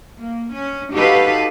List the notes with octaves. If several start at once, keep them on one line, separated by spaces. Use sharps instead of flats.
A#3
C#4
D#4 F#4 G4 A4 B4 F5